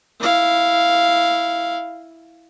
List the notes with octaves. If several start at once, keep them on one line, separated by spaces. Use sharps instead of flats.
E4 F5